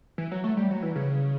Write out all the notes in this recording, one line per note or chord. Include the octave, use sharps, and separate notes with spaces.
E3
F#3
A3
G3
F#3
E3
C#3